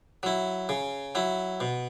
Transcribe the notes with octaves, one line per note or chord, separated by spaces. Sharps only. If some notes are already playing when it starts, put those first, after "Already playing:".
F#3 E4
C#3
F#3 E4
B2